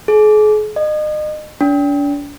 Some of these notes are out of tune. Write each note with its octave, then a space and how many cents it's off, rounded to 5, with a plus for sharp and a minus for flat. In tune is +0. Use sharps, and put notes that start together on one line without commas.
G#4 +40
D#5 -35
D4 -40